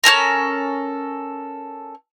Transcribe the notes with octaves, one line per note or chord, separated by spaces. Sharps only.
C#4 G4 A4 A#4